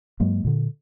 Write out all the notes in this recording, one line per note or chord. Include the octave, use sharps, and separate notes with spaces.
G2 F#3 G#3 A#3
A#2 D3